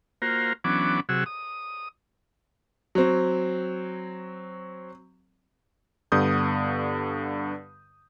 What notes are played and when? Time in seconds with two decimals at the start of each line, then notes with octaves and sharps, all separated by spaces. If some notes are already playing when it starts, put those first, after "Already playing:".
0.22 A#3 F4 F#4 A#4 C5
0.64 E3 F#3 B3 C#4 D4 D6
1.09 C3 F#3 F#4 G#4 E6
1.26 D#6
2.95 F#3 C4
6.12 G2 D3 B3 D#6 G6